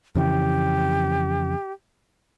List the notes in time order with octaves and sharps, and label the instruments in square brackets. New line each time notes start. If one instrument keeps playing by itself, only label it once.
[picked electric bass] F2 C#3 E3 [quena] G4